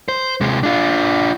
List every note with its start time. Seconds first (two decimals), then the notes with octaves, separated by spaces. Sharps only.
0.08 C5
0.41 C3 G#3
0.63 D4 F4